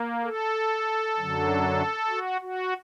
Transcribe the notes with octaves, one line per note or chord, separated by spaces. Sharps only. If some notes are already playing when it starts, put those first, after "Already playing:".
Already playing: A#3
A4
F#2 D3 F#3
F#4
F#4